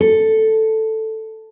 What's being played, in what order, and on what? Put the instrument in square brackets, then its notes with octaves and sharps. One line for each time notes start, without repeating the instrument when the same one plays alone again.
[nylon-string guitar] A4